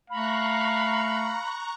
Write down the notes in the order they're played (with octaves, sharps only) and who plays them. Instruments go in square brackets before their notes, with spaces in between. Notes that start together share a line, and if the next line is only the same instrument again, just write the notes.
[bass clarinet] A3 [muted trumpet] F5 [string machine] A#5 C#6 F#6 [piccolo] B5